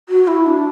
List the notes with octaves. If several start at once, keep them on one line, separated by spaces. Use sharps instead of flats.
F#4
E4
D4